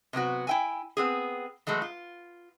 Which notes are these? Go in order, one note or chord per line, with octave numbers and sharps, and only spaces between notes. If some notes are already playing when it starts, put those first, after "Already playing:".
C3 F#3 B3 F#4
E4 G5 G#5
B3 C4 G#4
E3 F#3 G#3 A3
F4